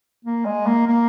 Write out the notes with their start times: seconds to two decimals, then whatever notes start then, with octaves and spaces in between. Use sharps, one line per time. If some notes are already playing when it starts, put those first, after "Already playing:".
0.25 A#3
0.45 G#3
0.66 A#3
0.87 A#3